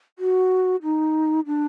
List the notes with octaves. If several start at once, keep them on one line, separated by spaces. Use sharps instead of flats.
F#4
D#4
D4